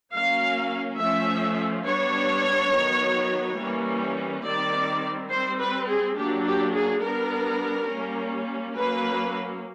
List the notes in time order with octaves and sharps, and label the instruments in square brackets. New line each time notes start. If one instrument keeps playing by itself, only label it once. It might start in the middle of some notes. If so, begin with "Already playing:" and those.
[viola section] F#3 A#3 C#4 F5
F3 A3 C#4 E5
G3 B3 D4 C#5
D#3 F#3 B3
E3 G3 A#3 C#4
D#3 G3 C4 D5
G3 C4 C5
B4
G#4
F#3 A#3 D4 G4
G4
G#4
G3 B3 D4 A#4
G3 A#3 C#4
F#3 A#3 C#4 B4